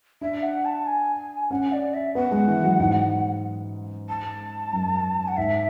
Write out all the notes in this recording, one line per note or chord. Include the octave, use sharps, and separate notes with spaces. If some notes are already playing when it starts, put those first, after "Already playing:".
D4 E5
F#5
A5
G#5
C#4 F#5
D5
E5
B3 F#5
G#3
E3
F#3
G#2
A5
F#2
F#5
G#2 E5